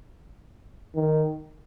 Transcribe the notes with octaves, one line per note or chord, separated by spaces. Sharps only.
D#3